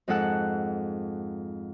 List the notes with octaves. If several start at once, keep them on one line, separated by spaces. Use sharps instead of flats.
F2 G#2 G#3 A4 F#5 F#6